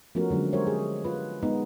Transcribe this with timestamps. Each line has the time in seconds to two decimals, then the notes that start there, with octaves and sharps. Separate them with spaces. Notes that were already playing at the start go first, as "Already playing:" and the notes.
0.15 F3 A3 B3 C#4 F#4 A#4
0.30 D3 F#3 G#3 C#4
0.53 G#3 G4 A#4 C5 C#5 E5
0.67 G#4
1.04 F4 B4
1.43 G#3 B3 D#4